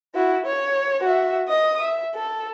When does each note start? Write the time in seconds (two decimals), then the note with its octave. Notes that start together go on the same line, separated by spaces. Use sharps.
0.15 E4 F#4
0.46 C#5
1.03 F#4 E5
1.48 D#5 D#6
1.81 E5
2.15 A4